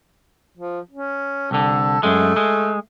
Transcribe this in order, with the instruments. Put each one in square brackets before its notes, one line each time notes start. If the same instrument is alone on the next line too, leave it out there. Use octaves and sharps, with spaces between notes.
[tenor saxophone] F3
C#4
[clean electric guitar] C2 D3 [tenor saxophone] A4
[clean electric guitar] F#2 G#3 [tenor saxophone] A3
[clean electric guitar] G#3